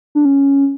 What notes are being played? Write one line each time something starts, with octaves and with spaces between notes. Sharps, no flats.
D4
C#4